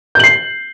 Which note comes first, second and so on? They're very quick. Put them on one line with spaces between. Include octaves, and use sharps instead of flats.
G6 F#7 C7